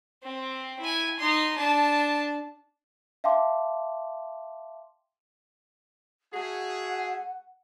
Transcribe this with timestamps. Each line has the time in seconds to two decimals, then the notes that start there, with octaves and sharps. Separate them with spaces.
0.23 C4
0.80 E4 G#5
1.19 D#4 C6
1.56 D4 A5
3.24 E5 F5 G5 A5 C6 D6
6.33 A3 F#4 G#4 F#5